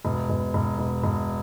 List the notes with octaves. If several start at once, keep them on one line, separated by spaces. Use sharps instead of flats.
E1
E1
E1
E1
E1